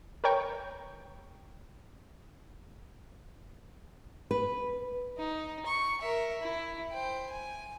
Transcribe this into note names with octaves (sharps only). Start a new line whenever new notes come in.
A#4 B4 C#5 G5 C#6
B4
D#4
C#6
A#4 E5
E4
C5 G5
G#5